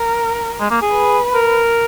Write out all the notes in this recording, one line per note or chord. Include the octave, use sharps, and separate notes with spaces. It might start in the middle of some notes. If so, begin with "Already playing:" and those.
Already playing: A#4
G#3
A#3
G#4
B4
A#4